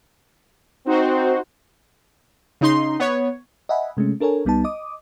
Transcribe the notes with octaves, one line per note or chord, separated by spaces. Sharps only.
C4 D#4 F#4 C5
C#3 D#4 C6
B3 C#5
D#5 E5 F#5 G#5 B5
C3 G#3 A3 C#4
D4 A4 A#4 C#5 G#5
C2 G3 B3 D#4 A5
D#5 D6 D#6